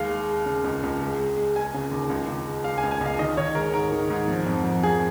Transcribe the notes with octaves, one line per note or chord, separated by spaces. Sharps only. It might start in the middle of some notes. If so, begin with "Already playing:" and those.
Already playing: D#2 G#3 F5
G#3
G#3
C#3
C#2
C#2
G#3
G#3
G#3
G#3 G#5
C#3
D#2
C#2
C#2
G#3
G#3 F5
G#5
C#2
G#5
C#2 F5
D#3 D#5
D#3 C#5
G#3 A#4
G#2 A#4
D#3
G#2
F3
F2
F2
F3 G#4